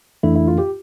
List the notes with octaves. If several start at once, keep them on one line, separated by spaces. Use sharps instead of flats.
F2 E3 A3 D4 E4 A4
E4
F4
G4